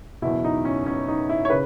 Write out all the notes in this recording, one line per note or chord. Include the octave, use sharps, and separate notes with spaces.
F#1 E2 B2 E4
D#4
C#4
C#4
D#4
E4
C#5
C#3 B4